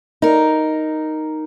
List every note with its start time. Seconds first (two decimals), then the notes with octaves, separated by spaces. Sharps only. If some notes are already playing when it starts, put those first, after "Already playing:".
0.22 D#4 A#4